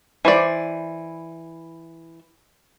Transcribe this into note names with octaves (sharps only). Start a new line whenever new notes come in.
E3 C5 D5